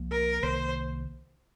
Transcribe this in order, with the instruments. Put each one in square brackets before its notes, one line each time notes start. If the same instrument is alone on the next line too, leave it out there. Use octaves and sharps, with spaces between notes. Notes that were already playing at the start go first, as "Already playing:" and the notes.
Already playing: [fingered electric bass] C2 F3 A#3
[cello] A#4
[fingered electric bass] C2 C3 D#3 A#3 [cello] C5